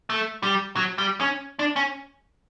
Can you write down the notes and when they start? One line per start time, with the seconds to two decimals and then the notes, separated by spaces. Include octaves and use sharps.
0.10 A3
0.43 G3
0.76 F#3
0.98 G3
1.21 C#4
1.59 D4
1.76 C#4